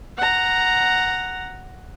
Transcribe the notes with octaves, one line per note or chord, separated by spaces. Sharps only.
F#5 A#5